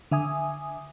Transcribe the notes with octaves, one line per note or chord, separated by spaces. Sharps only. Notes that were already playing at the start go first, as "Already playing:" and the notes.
D3 E5 G#5 D#6